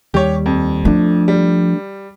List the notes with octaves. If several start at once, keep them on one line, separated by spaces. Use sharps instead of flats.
D#2 G3 G4 C#5
F2
F3 A3 D4
G3